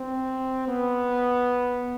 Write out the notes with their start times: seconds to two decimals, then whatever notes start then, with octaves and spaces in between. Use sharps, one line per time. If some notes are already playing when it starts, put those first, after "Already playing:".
Already playing: C4
0.68 B3